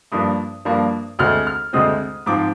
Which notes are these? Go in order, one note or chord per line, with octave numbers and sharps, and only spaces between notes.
G2 F3 A#3 D4 D#6
G2 F3 A#3 D4
D2 D3 G#3 C4 F6
F6
D2 D3 G#3 C4 D#6
G#2 F3 C4 D6